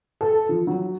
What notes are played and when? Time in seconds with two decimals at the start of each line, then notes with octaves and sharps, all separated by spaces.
0.21 A4
0.49 F3
0.67 F#3